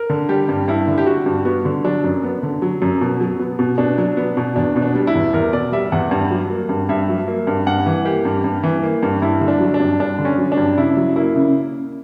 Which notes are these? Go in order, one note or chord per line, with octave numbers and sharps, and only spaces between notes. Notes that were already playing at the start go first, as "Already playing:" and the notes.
Already playing: A#4
D3
G3 G4
G2
G2 E4
D3
G4
G3 F#4
G2
B3 F#4
D3
F#3 D4
F#2
B3
D3
F#3
F#2
B2
F#3
B3
B2
B2 D4
F#3
B3
B2
E2 D4
B2
D4
G3
E4
E2
E2 A#4
B2 D5
G3 E5
E2 F#5
G2
F#3
A#3
G2
G2 E5
F#3
A#3
G2
G2 F#5
E3
A#3 G4
G2
G2
E3
A#3
G2
G2 E4
D3
D4
F#3
D4
G2
G2 D4
D3
C#4
F#3
D4
G2
C#3 E4
F#3
A#3 E4
C#3